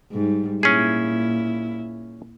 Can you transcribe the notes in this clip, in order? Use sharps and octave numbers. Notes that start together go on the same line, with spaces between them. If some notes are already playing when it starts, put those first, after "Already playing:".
G#2 G3
A#2 C#4 E4 G#4